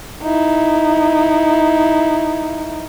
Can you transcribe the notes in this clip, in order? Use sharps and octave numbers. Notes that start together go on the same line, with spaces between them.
D#4 E4